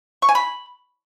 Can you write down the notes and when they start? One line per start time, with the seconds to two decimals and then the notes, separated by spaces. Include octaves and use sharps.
0.22 C#6
0.29 G#5
0.35 B5